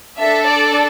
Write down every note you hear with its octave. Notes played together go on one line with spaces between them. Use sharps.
D4 A4 E5
D5